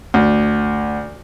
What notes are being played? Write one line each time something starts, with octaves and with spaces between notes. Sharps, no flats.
D2